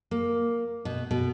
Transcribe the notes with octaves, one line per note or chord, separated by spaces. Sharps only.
A#3
B2
B2